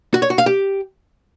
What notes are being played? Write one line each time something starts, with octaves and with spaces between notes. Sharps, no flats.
F#4
C#5
F#4
F5
G4